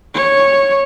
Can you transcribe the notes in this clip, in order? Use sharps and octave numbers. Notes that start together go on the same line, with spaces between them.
C#5